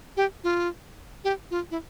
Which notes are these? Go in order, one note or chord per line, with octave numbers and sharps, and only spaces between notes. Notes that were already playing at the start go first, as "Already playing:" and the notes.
G4
F4
G4
F4
E4